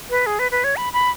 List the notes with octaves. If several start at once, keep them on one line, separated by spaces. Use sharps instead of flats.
B4
G#4
B4
B4
C#5
B5
B5